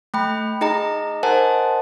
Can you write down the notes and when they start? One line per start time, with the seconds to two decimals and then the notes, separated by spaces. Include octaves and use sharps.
0.14 A3 G5 B5
0.61 D#4 G#4 D#5 A#5
1.23 A#4 C5 D#5 F#5 G#5 A5